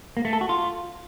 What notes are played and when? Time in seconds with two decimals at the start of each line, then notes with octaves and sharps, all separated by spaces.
0.17 A#3
0.25 A3
0.33 A4
0.41 F#4
0.49 F4